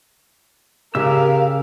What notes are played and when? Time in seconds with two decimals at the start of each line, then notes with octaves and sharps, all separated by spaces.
0.95 C#3 G4 A#4 F5 E6